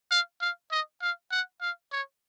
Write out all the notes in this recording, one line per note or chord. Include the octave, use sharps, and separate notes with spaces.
F5
F5
D#5
F5
F#5
F5
C#5